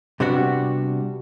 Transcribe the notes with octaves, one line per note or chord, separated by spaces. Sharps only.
C3 G3 B3 D4 F#4